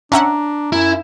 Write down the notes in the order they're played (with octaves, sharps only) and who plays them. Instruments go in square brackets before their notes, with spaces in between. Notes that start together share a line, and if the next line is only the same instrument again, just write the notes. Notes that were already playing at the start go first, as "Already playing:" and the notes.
[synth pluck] C#4 E5 F#5 [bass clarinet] D4 [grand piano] A#5
[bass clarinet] F#2 [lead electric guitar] E4